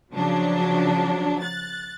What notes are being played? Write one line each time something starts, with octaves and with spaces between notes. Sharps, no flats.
C#3 F3 F#3 D4
F#6 A6